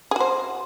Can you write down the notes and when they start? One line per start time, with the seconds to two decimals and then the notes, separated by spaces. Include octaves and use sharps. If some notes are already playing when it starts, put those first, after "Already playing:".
0.11 G#4
0.16 F#4
0.20 C5